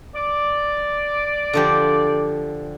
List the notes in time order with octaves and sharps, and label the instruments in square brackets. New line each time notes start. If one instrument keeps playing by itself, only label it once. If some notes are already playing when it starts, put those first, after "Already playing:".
[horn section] D5
[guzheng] D3 F3 G4